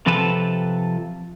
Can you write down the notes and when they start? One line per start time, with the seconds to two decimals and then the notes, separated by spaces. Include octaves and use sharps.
0.06 C3 F3 F4 A4 B4 A5